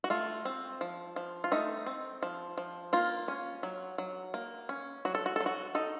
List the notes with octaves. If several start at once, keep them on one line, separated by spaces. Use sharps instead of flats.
F#4
A3 F4
C4
F3
F3
F4
A3 D#4
C4
F3
F3
A#3 F4
C#4
F#3
F#3
A#3
C#4
F#3 F#4
A4
F#4
F#3 A4
F#4
D#4 A4